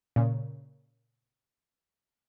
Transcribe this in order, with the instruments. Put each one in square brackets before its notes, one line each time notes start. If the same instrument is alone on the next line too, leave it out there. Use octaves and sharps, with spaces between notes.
[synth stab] A#2 C#3